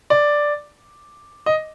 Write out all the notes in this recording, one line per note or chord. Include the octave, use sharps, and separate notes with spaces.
D5
D#5